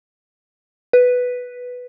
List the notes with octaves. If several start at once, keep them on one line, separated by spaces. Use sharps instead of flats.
B4